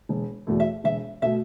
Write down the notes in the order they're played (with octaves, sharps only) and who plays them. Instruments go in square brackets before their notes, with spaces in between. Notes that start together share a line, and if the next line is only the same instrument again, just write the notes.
[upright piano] E1
E2 B2 A3
[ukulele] E5
[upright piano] E1 [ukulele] E5
[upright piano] B2 A3 [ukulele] E5